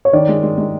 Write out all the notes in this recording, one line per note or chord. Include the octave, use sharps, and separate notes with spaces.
C#5
D#3 D5
G#3
G#3
G#3